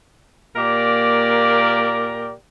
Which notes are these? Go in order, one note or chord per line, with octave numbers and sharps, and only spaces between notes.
A#2 A#3 G4 A#4 D5